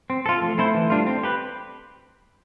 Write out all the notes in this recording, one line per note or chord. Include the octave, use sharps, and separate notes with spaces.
C4
F4 A4
F3 A3
C4 E4 A4 C5
E3
G3 D4 F4
C4
G4 B4